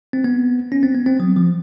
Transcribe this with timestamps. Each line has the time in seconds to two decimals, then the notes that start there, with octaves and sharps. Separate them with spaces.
0.13 C4
0.24 B3
0.72 C#4
0.83 C4
0.94 B3
1.06 C4
1.20 F#3
1.36 F3